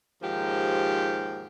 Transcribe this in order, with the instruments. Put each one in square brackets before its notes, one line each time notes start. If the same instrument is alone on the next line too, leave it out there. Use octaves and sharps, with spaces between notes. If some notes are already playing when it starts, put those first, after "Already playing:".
[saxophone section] D#2 G#2 F3 G4